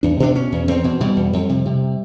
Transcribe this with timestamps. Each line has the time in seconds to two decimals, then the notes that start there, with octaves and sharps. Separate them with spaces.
0.03 E2 D4
0.20 B2 D4
0.35 B2 C#4
0.52 E2
0.68 E2 C4
0.84 B2
1.01 B2 G3
1.16 E2
1.33 F2
1.49 C3
1.66 C3